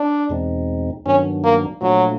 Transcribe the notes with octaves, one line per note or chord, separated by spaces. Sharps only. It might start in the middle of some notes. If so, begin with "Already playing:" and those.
Already playing: D4
E2 B2 G#3 C4 D#4
G2 D#3 F#3 B3 C#4 D4
A#3
A#2 F3 F#3 A3 D4 F4